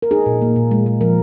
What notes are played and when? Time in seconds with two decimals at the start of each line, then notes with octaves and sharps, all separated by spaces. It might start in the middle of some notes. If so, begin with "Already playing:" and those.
0.02 A#4
0.11 D#4 G#4
0.26 A#2
0.42 A#3
0.56 A#2
0.71 G#3
0.86 G#3
1.01 F3 A#4